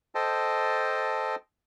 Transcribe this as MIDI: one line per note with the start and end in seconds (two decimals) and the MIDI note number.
0.15 1.35 69
0.15 1.35 72
0.15 1.35 75
0.15 1.35 79
0.15 1.35 81